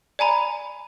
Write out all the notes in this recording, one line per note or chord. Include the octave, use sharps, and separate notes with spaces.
D5 G#5 A#5 B5